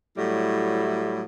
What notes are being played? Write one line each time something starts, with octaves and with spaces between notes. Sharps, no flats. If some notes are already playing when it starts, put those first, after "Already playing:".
A2 F#3 G3 E4